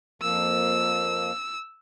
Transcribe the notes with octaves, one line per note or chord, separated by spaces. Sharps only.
F2 F3 A#3 E6